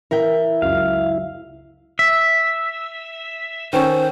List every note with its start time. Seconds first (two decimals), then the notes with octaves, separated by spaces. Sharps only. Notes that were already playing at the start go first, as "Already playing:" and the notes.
0.11 E3 E4 A#4 E5 G5
0.62 C#2 F#2 F5
1.99 E5
3.73 D#3 C#4 A4 C5